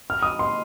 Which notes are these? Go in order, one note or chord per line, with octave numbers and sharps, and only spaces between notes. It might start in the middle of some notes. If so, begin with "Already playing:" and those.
F6
D#6
C6